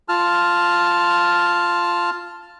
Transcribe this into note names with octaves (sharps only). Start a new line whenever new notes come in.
F4 A5 F6